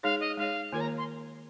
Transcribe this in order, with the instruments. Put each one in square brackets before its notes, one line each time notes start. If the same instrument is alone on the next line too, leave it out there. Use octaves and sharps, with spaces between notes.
[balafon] G#3 D#4 G#4 C#5 [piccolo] F5
[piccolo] D#5
[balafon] G#3 D#4 G#4 C#5 [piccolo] F5
[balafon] D#3 A#3 F4 A#4 C#5 [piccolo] G#5
[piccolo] A#5
C6